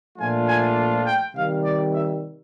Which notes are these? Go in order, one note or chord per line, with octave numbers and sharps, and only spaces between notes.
A#2 F3 A3 D4 F4 G#5
G#5
G5
C3 D#3 G3 F5
D5
E5